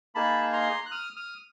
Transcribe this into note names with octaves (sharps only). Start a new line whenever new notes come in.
A#3 D#4 G#4 A5 B5
A#5 C6
F#6
D#6 F6
D#6 F6